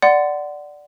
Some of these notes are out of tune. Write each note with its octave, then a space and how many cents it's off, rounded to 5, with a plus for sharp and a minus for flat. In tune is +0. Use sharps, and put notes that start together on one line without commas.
D5 +0 F#5 +5 C6 -30